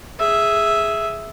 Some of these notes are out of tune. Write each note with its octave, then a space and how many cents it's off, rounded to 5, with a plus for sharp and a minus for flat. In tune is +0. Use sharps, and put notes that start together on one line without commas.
G#4 +0 E5 +0